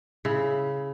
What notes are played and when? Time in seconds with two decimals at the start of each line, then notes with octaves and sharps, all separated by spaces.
0.25 C#3 E4